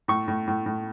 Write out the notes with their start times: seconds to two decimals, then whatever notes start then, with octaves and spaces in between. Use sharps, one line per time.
0.08 A2 C#6
0.28 A2
0.48 A2
0.66 A2